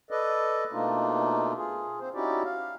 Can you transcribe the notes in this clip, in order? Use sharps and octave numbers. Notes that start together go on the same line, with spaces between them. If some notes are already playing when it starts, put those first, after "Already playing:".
A4 B4 D5 D#5
B2 A3 A#3 D4 D#4 F4
F4 G#4
C4 C5
C#4 D#4 E4 F#4 G4 D5
F5